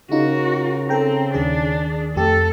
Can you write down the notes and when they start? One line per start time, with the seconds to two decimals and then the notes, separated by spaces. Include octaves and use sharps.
0.12 C#3 D#4 F4 F#4 A#4
0.89 C4 A4 G5 A#5
1.34 D#2 D#3 D4 G#4
2.16 F2 A3 G4 A4